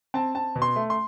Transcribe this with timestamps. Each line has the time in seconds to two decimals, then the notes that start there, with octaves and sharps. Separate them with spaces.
0.14 C4 A5
0.35 C4 A5
0.55 B2
0.62 C6
0.76 A3
0.90 C6